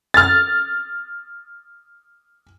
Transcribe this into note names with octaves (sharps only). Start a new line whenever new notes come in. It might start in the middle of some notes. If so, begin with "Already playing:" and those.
F6 A6